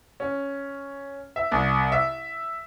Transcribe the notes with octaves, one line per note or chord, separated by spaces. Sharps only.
C#4
E5
C2
E5